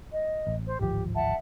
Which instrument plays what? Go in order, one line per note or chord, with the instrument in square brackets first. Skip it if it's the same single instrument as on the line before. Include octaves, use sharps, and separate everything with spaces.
[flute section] D#5
[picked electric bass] A1
[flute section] C5
[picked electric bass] D1 G#1 F3 [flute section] G4
[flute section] E5 F#5 A5